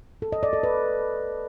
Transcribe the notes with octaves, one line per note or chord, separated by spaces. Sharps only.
A4
D#5
D5
A4
B4